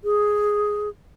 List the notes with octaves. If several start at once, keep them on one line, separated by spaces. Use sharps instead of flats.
G#4